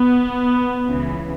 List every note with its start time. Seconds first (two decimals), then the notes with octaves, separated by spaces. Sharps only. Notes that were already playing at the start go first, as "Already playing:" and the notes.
Already playing: B3
0.85 C#2 C#3 E3